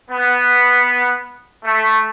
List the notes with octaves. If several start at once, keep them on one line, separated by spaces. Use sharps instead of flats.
B3
A3